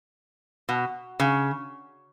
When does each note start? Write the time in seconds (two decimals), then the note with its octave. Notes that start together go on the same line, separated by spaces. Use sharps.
0.69 B2
1.20 C#3